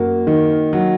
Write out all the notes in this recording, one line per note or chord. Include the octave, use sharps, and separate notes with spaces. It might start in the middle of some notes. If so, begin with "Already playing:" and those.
Already playing: F#2 A#3 F#4
D#3
F#3